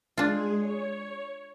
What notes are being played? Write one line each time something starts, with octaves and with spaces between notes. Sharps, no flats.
G#3 D4 F4 G#4
C#5